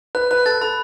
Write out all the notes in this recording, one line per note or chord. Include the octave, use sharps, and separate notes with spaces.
B4 F#6
B4 F#6
A4 A6
A4 B5